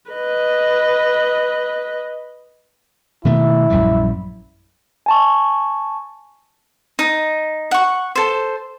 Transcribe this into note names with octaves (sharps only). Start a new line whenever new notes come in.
B4 D#5
B2 D#3 A3 E4
A#1 F#2 G3
G#5 A5 C#6
D#4
F#5 C#6
A4 C5